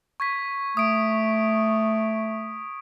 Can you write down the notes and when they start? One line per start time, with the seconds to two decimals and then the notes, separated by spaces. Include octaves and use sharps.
0.20 C#6 G#6 B6
0.77 A3 D#6 D7